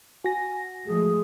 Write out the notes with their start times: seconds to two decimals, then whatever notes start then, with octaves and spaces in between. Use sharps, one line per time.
0.24 F#4 G#5 A#6
0.86 F3 G#3 A3 G#4